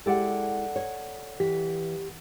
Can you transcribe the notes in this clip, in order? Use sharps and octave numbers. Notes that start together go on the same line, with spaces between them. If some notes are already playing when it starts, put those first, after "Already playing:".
G#3 E4 G4 A4 D5 F#5
C#5
E3 G4 B6